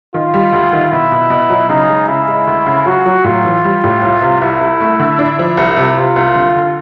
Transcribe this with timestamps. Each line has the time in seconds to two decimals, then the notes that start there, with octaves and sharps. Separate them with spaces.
0.14 D#3 F4
0.34 G3
0.53 D2
0.73 D#3
0.91 B2 E4
1.12 B2
1.30 B2
1.50 F#3
1.69 C#3 D#4
1.89 G#3
2.08 C#3 E4
2.28 G#3
2.47 D2
2.66 C#3
2.86 F#3 F#4
3.06 F#3
3.24 A2 F4
3.45 E3
3.64 G3
3.84 A2
4.03 C2
4.21 C3
4.41 C2 E4
4.61 C2
4.81 A3
5.00 D3
5.19 D4
5.39 F3
5.57 C2 E4
5.77 C3
5.97 C3 F4
6.16 C2
6.35 D3
6.56 D3